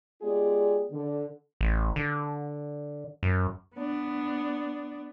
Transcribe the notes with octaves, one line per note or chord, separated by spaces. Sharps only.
G#3 B3 F4 G4 G#4 D5
D3
A1
D3
F#2
B3 D4